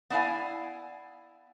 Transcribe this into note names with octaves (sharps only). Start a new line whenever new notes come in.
B3 D4 E4 D5 F5 G#5